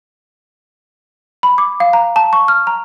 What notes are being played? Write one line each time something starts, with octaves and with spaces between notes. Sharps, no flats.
B5
D6
F5
A#5
A5
C#6
F6
A#5